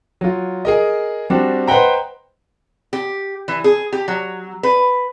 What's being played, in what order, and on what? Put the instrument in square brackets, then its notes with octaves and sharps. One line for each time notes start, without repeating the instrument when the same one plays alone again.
[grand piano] F#3 F4
G#4 A#4 D#5
G3 C4 D4 F#4
B4 C5 D#5 F#5 G5 A#5
[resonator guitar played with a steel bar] G4
E3
G#4
G4
F#3
B4